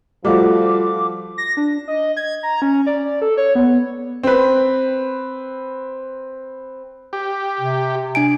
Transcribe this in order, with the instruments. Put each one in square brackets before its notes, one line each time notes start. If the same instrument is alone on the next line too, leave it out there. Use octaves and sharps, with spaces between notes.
[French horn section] F3 F4 [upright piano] G3 A3 F#4 [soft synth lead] D6
[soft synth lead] A#6
D4
D#5
G#6
A#5
C#4
D5
A4
C#5
B3
[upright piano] C4 B4
[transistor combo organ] G4
[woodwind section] C3
[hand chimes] D4 G#5 D7